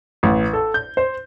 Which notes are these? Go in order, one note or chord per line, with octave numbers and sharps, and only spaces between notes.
A1
A4
G6
C5